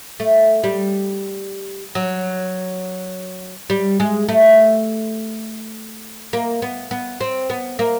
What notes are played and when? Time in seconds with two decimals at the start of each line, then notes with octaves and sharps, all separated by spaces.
0.20 A3
0.64 G3
1.95 F#3
3.70 G3
4.00 G#3
4.29 A3
6.33 A#3
6.62 B3
6.91 B3
7.21 C4
7.50 B3
7.79 A#3